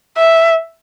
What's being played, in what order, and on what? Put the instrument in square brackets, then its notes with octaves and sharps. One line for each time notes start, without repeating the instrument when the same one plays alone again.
[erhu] E5